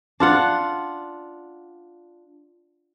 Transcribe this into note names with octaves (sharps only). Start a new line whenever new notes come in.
D4 F4 F#5